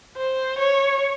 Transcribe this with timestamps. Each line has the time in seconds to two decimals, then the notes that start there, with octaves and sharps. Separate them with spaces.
0.17 C5
0.58 C#5